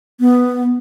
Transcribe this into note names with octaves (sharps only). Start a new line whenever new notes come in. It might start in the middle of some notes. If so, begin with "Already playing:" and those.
B3